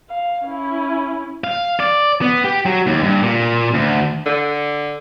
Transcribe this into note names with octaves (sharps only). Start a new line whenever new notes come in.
F5
C#4 E4
F5
D5
B3
G4
F#3
D#2
G2
A#2
D2
D3